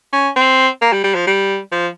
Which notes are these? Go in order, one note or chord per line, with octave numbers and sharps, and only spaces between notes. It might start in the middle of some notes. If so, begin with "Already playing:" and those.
C#4
C4
A#3
G3
G3
F3
G3
F3